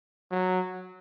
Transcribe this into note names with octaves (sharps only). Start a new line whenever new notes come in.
F#3